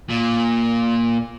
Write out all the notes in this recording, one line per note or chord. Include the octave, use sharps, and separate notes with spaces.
A#2